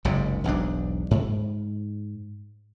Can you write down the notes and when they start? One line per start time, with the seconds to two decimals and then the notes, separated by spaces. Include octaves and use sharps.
0.05 F#1 C#2 G#2 C3
0.44 E1 B1 G#2 D4
1.11 G#2